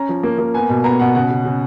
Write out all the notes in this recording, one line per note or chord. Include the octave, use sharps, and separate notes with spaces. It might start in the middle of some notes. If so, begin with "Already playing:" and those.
Already playing: C#4 A#5
F3
A#3
A#3
B3 G#5
B2
B3 A#5
B2 F#5
C#3 F#5
C#3
C#3